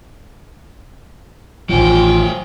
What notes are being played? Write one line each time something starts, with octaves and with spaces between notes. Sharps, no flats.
A1 D#3 F#3 F4 C5 G5 G#5